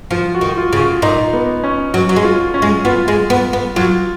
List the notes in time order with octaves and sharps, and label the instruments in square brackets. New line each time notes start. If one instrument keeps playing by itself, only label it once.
[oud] F3 [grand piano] F4
[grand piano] F#4
[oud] D#3
[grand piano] F4
[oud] C#3
[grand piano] F4
[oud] A#2 [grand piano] D#4
[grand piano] B3
C#4
[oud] F#3 [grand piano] F#4
[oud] F#3
G#3
[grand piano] F4
C#4
[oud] G#3
[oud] B3 [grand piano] F4
[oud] G#3
B3
B3
[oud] F#3 [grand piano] F4